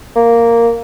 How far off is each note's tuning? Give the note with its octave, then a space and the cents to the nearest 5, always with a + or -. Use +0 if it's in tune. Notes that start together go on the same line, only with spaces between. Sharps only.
A#3 -5